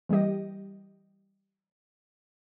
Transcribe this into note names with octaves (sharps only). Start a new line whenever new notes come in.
E3 G3 A#3 G4 D#5